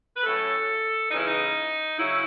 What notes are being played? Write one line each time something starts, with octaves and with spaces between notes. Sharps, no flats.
B4
A2 F#3 A3 C#4 A4
C#3 E3 G#3 C#4 D#4
E4
D#4
C#3 F#3 C#4 E4